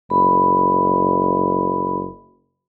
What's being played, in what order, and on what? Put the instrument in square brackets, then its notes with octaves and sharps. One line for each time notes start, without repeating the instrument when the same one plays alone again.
[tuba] F#1 [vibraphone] B5